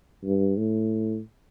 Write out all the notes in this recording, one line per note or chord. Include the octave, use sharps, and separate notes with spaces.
G2
A2